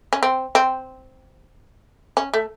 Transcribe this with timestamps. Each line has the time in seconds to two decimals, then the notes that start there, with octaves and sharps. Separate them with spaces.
0.13 C#4
0.23 C4
0.55 C4
2.17 C#4
2.34 A3